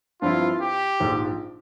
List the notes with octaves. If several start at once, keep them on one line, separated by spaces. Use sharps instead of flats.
G2 F3 C4 E4 F4
G4
A#1 G#2 F3